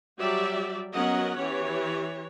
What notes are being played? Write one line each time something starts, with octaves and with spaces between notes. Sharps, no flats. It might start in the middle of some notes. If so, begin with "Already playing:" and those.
F#3 G3 F#4 G4 D5 E5
F#3 B3 C#4 A#4 D#5 F#5
E3 G4 C#5